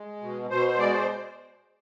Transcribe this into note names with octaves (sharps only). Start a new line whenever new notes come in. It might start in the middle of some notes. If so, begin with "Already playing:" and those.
Already playing: G#3
B2
B2 C5
C5
G#3 D5
C5